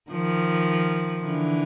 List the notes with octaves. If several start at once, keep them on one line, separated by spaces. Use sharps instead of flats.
D#3 F3
D3 E3